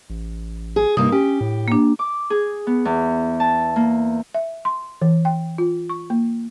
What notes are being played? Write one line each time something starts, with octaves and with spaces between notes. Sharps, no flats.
A1
G#4
G2 C3 A#3 D#4 D#6
C#4 G4
A2
A#3 D4
D6
G#4
B3
E2
A5
A#3
E5
C6
E3
G5
F4
C#6
A#3